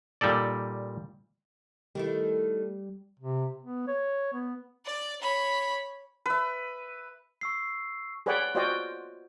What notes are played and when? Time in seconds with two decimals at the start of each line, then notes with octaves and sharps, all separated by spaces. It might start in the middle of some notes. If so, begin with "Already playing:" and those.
0.21 A#2 G3 D#4 A4 D5
1.95 D#3 G3 A3 E4
3.20 C3
3.63 B3
3.88 C#5
4.33 B3
4.86 D5
5.21 C#5 B5
6.26 B4 E5
7.41 C#6 E6 C7
8.26 G#4 B4 C#5 D5 F#5 G5
8.55 F4 F#4 C5 D5 D#5 G5